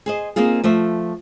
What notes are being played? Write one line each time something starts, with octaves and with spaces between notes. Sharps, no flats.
G#4 C5 D#5
A#3 C4 D#4 F4 G#4
F3 A3 C5 E5